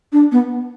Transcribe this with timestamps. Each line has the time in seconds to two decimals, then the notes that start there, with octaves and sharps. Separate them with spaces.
0.13 D4
0.32 B3